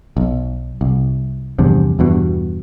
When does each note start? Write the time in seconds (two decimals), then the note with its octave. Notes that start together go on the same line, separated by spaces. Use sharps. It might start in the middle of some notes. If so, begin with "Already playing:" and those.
0.17 B1
0.81 C2
1.59 A#1 E2 G2 C3
1.99 E2 G2 B2